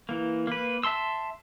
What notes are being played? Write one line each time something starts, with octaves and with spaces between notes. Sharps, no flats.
E3 A#3
A#3 B4
E5 A5 C6 E6